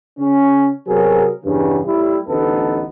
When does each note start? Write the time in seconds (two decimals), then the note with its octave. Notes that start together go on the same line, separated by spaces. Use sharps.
0.19 C#3 C#4
0.87 C3 F#3 B3 G#4 A#4
1.45 E2 G2 C#3
1.86 A2 G3 E4
2.28 A1 D2 B3 D#4 A4